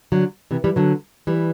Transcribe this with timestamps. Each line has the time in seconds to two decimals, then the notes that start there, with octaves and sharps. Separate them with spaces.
0.12 D3 F#3
0.51 C3 E3
0.64 E3 G3
0.76 D3 F#3
1.27 E3 G3